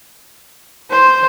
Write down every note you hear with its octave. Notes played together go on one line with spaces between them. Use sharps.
C5